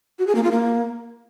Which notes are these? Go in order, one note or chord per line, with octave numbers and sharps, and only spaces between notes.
F#4
G#4
A#3
F4
A#3